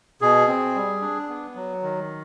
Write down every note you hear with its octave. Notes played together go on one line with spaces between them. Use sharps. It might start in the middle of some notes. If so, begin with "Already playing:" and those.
B2 G#4
C4
G3
D4
B3
F#3
D#3